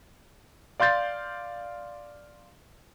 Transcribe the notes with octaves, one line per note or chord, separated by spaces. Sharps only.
D5 F5 C6 G6 A6